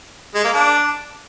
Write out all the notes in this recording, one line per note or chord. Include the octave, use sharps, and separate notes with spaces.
G#3
A#3
D4